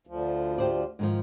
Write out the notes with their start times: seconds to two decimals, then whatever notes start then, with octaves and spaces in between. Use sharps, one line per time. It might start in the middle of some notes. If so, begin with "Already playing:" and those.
0.07 D2 F3
0.58 G4 C5 D5
0.99 G#2 D#3 F3